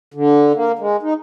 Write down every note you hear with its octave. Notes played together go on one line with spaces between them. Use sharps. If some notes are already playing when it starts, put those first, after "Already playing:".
D3
A#3
G#3
D#4